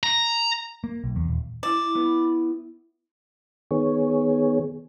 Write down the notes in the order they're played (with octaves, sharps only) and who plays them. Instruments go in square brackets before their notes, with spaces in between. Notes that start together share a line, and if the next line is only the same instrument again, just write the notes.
[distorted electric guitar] A#5
[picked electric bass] A#3
B1
E2
D#1
[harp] E4 E7 [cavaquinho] D5
[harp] B3
[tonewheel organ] D#3 B3 G#4 C#5